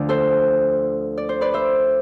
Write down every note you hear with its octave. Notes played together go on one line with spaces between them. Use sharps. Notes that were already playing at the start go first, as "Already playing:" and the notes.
Already playing: D2 D3 F3 D5
A4 C5
D5
C5
B4 D5
C5 E5